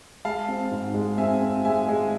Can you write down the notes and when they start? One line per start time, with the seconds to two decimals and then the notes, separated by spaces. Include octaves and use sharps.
0.25 G#3 F5 A5
0.48 C4
0.71 G#2
0.94 G#3
1.18 C4 E5 G#5
1.42 C4
1.65 G#3 E5 G#5
1.88 G#3